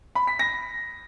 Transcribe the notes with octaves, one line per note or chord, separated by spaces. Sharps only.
B5
B6
A#6